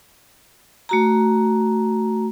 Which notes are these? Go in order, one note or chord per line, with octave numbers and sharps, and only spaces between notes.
A3 F#4 A#5